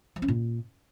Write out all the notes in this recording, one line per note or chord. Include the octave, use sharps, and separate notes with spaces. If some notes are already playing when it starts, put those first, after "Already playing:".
F3
C#4
A#2